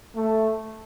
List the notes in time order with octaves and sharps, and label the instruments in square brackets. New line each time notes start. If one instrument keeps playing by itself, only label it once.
[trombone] A3